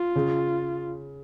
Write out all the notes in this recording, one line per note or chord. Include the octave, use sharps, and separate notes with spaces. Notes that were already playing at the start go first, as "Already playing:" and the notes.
Already playing: F4
C#3